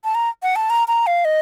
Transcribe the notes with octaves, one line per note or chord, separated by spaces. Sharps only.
A5
A#5
F#5
A5
A#5
A#5
F5
D#5